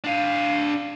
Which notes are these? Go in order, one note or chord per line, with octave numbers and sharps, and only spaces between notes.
D4 F5